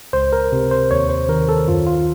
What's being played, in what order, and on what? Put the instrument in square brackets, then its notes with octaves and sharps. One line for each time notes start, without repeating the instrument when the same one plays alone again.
[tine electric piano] C#2 C5
A#4
C3
C5
D#2 C#5
C5
D#3 A#4
A4
F#2 F4
F4